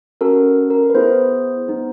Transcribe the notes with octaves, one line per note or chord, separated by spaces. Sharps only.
C#4 F#4 A4 A#4
A#4
B4
B3 E4 G#4 C5
B3 D#4 G#4